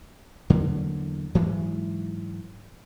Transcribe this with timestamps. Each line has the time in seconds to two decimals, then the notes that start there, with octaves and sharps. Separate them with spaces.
0.50 E2 D3 F#3 A#3
1.35 G#2 E3 F#3 G#3